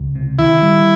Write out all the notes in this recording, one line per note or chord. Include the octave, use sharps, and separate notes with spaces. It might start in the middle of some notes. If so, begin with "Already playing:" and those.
Already playing: C#2
C3
D#3 E4
G3